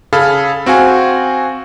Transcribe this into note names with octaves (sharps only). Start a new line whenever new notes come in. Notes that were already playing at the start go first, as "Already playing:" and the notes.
C#3 G#4 A4 F5 B5 F6
C4 F#4 F5 G#5